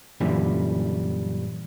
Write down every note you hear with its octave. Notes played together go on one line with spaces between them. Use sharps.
F#2 A#2 D3 E3 G3